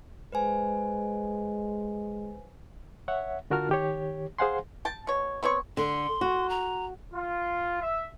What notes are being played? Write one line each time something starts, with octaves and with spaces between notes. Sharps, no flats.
G#3 B4 C5 G#5
C#5 E5 F#5
D3 F4 F#4 A#4 A5 F6
D#3 G4 C#5
G#4 C5 F5 F#5 G#5 C6
G5 A5
B2 C#5
B3 C4 C#5 C#6
D3 C6
F#4
A#5
F4
E5